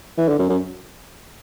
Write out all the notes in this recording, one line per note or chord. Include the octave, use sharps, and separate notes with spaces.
E3
D3
F#2
F#2